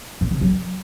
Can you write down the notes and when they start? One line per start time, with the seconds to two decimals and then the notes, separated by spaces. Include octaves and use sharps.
0.21 A#2
0.31 C#3
0.41 F#3